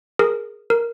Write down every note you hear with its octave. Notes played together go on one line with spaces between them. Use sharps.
G#4 A#4
A#4